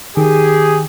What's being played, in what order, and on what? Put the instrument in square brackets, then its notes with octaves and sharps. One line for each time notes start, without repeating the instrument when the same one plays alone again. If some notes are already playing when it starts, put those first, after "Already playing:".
[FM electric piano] D#3 [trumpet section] G4 G#4